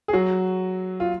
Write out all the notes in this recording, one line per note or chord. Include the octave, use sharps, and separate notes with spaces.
G#4
F#3 F#4
F4